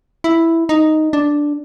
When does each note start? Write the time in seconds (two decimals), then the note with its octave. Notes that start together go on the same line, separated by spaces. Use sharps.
0.24 E4
0.69 D#4
1.13 D4